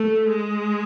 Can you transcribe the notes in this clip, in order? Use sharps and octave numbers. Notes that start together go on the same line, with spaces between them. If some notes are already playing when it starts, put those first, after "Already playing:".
Already playing: A3
G#3